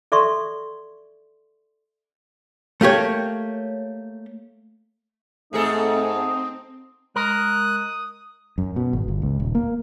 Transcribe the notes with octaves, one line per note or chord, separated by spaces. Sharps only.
A4 D5 E5 C6 C#6
A3 A#3 G4 C#5
G#2 A3 C4 D#4 G#4 A4
G#3 A#4 D#6 F#6
F#2
B2
G#1
G1
C#2
D#1
A#3